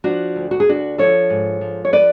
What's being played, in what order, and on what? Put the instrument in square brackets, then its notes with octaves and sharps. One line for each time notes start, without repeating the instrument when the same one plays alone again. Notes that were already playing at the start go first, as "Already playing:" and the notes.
[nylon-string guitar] F3 D4 F#4
D2
F#4
G#4
D2 D4 F#4
F3 A4 C#5
G#2
F3
C#5
B4 D5